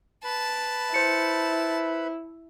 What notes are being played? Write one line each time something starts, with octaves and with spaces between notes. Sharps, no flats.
B4 A5 B5
E4 C5 C#7